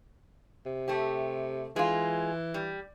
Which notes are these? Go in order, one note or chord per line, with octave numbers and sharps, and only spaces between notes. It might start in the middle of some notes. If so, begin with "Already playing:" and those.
C3
A3 C4 G4
E3 G#3 F4
G3